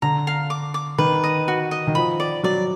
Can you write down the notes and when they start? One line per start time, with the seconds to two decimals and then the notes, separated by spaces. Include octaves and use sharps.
0.02 D3 A#5
0.27 F5
0.50 D6
0.74 D6
0.98 D#3 B4
1.24 D#5
1.48 F#4
1.71 D#5
1.87 D#3
1.95 F3 B5
2.20 D5
2.43 F#3 D5